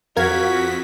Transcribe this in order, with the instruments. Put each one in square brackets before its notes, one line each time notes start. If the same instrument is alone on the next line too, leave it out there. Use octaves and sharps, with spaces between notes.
[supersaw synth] F2 B6 [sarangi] F#4 [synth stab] A#4 F5 G#6